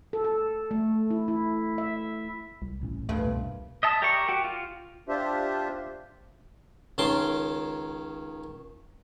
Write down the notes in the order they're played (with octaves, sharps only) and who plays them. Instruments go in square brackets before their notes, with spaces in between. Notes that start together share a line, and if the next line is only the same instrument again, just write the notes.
[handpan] A4
A4
A3
E4
E4
E5
[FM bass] C2
[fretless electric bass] A1 A2 C#4
[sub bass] C2 [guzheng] G2 A#2 F3 [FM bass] A3
[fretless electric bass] E2 B2
[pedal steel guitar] D#5 E5 A5
G4 A#4 D5 E5 C#6
F#4 G4
F4
[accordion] D4 F4 G4 C5 E5
[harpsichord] C#2 D#3 C#4 A5 C6 D6